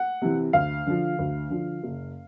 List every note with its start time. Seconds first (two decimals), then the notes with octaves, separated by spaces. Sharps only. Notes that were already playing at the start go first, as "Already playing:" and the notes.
Already playing: F#5
0.22 C3 E3
0.53 D2 F5
0.87 D3 F3
1.19 D2
1.50 D3 F3
1.83 F#1